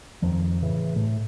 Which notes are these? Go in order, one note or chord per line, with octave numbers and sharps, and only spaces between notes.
F2 D#3 F3
A2 C#3 E3
A2 A3